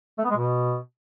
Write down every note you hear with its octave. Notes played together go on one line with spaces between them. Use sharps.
A3
B3
G#3
B2